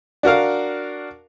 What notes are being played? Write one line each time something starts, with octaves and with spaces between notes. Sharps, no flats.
D4 F#4 A#4 F5